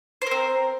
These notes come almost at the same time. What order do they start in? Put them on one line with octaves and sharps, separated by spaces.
C5 A#4 C4